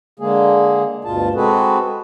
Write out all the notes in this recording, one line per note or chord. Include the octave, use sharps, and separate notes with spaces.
D3 G#3 A#3 G#4
D2 G2 B2 F4 A5
G#3 C4 F#4 G#4 A4 B4